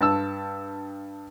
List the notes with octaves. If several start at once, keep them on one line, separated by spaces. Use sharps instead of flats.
G2 A5 E6